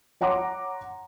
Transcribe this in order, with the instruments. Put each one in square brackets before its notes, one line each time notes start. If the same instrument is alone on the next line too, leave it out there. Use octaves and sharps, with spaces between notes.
[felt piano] C#5 F#5 A#5 C6 D6